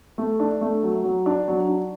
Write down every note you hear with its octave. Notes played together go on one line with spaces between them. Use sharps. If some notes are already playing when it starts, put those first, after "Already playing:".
A3
D4
A3
F#3
F#3
D4
F#3
D4